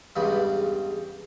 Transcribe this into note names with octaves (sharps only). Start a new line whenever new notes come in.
E2 G2 C#3 G3 G#3 B5